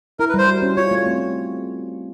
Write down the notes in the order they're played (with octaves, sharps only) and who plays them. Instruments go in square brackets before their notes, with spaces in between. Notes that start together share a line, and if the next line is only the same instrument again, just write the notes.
[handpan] E4 [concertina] A#4
[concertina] B4
[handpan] G3 [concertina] C5
[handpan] F#4
C#4
[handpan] F4 [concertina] C#5
[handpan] A3
C4